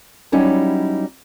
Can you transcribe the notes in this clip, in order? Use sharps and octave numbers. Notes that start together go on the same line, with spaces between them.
F#3 G3 C#4 D#4 E4 G4